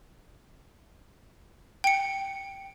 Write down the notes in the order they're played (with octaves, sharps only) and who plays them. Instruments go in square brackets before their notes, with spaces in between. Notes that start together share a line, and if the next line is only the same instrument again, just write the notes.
[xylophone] G5 C#7